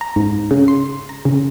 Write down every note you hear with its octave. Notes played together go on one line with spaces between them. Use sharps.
A#5
G#2
C#3
C6
A#5
C#3